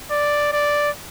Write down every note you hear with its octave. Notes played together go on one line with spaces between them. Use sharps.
D5
D5